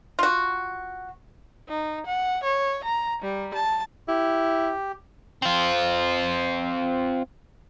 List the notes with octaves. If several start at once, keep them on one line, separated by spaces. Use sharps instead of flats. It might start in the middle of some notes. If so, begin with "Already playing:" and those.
F4 F#4
D#4
F#5
C#5
A#5
G3
A5
E4 G4
C4 F4